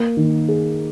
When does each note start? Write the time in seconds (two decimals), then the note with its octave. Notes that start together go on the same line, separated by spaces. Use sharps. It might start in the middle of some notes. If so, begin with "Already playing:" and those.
Already playing: A#3
0.17 D#3
0.48 G#4